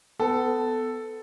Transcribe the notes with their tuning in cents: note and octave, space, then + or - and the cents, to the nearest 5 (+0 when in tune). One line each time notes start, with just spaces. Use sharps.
B3 +25 A4 +0